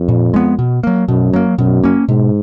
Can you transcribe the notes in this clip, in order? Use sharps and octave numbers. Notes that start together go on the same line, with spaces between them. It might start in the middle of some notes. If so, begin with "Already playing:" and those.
Already playing: F2
A#2
G#3 B3
B2
F#3 A#3
F#2 B2
F#3 A#3
F#2 B2
A#3 C#4
G#2 B2